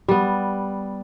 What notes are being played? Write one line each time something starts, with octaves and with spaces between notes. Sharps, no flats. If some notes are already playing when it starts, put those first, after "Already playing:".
G3 B3